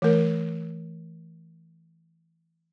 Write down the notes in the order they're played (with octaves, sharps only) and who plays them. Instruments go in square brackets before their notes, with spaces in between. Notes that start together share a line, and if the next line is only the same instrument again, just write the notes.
[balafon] E3 A3 A#4